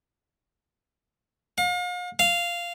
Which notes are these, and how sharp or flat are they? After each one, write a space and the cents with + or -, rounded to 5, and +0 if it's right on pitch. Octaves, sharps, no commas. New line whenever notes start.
F5 +40
F5 -10